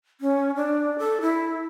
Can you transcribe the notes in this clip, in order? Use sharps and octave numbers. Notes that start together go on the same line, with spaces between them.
C#4
D4
A4
E4